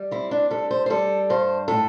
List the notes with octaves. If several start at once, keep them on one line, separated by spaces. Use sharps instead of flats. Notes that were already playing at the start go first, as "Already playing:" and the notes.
Already playing: G3
C4 E4
D4
G3 A4
C5
C5
G3 A4
G2 C5
A2 A4